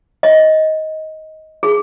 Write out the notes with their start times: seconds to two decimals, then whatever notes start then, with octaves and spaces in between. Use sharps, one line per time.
0.23 D#5
1.63 G#4